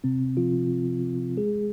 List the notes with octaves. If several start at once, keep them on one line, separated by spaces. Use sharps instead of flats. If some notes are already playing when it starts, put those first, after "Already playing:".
C3 C4
F3 F4
G#3 G#4